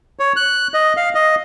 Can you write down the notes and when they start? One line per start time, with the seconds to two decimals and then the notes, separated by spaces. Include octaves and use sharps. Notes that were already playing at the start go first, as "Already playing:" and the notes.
0.19 C#5
0.36 F#6
0.74 D#5
0.97 F5
1.15 D#5